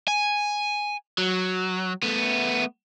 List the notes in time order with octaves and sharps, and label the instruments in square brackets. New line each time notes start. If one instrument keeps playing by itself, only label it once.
[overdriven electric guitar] G#5
F#3
A3 B3